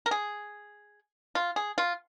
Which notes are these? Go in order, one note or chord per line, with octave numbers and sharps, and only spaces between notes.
A#4
G#4
F4
G#4
F4